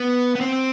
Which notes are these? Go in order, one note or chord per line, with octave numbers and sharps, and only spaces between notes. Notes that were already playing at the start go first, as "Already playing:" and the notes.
Already playing: B3
B3
C4